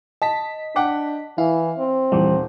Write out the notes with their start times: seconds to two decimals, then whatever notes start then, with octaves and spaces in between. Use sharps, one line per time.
0.22 D#5 A5 B6
0.76 D4 F#5 G5 D6
1.38 E3 E4 F5
1.78 C4
2.12 D#1 E3 G3